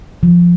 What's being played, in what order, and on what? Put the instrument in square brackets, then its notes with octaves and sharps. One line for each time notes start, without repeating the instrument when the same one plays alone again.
[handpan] F3